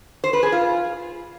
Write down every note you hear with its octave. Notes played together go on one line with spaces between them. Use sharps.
C5
B4
G#4
F4